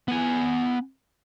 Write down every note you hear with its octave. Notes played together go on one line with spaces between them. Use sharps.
B3 G#5